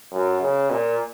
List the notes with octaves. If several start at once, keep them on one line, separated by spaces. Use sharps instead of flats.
F#2
C#3
A#2